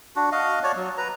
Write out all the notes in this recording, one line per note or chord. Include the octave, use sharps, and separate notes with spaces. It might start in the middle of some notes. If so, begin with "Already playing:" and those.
D4 F#4
F#4 D#5 F5
F#4 C#5 D5 A5
F#3
B4 A#5